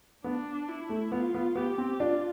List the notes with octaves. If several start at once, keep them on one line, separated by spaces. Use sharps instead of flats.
B3 D4
E4
A3
B3 F4
B3
B3 G4
C4
D4 F4